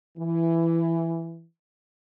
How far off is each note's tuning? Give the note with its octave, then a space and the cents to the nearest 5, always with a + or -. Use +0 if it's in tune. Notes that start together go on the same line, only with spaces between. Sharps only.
E3 +10